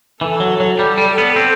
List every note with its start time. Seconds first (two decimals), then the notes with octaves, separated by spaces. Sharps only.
0.21 E3 A4
0.40 F#3
0.60 F#3
0.79 G3 A4
0.98 G3
1.18 B3
1.36 C4